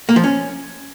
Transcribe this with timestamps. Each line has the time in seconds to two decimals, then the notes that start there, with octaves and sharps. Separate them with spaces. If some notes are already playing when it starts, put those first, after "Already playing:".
0.09 A#3
0.16 F3
0.24 C#4